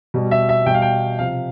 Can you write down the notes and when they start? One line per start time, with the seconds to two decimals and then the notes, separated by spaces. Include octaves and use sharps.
0.14 B2 G3
0.31 E5
0.49 E5
0.66 B2 G3 G5
0.74 F5
0.82 G5
1.19 C3 F3 F5